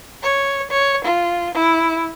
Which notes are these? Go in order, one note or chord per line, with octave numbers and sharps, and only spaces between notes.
C#5
C#5
F4
E4